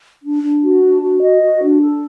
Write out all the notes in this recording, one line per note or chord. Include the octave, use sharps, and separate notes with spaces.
D4
D4
F#4
D4
F#4
D#5
F#4
D4
A4